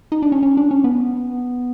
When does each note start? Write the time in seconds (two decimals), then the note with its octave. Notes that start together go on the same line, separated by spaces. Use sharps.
0.12 D#4
0.22 D4
0.32 C#4
0.43 C#4
0.57 D4
0.71 C#4
0.84 B3